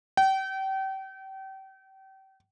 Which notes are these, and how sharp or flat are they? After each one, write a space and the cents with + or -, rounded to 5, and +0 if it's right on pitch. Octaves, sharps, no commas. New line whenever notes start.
G5 -35